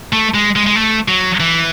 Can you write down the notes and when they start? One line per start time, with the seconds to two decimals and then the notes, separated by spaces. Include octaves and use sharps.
0.13 A3
0.34 G#3
0.56 G#3
0.66 G#3
0.76 A3
1.08 F#3
1.40 E3